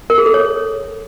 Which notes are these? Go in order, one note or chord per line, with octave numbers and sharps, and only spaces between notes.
A#4
G#4
A4
C#5